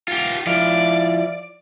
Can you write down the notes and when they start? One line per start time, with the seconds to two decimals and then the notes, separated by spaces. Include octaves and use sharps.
0.08 F4 G4
0.47 F3 E4 D5 F5